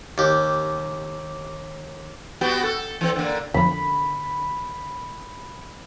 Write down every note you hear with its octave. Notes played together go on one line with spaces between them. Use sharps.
D#2 G4
B3 F#4 G4
A4
E3 C4
D3 A#3
F2 D3 F3 B5